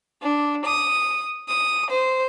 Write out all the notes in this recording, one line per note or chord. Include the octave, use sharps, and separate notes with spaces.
D4
D#6
D#6
C5